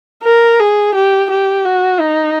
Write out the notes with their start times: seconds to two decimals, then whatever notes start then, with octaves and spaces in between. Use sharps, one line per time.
0.24 A#4
0.60 G#4
0.95 G4
1.30 G4
1.65 F#4
2.00 D#4